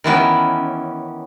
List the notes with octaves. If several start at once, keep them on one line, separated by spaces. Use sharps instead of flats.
D#3 E3 B3 C#4